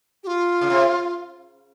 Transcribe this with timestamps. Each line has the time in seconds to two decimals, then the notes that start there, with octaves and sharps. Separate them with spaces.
0.24 G4
0.27 F4
0.61 C#3
0.70 C3